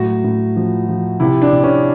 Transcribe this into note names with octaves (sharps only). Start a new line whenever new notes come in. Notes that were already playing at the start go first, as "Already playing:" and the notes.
Already playing: A2 F#3 F#4
A2
F3
F3
C3 E4
D4
C3
C#4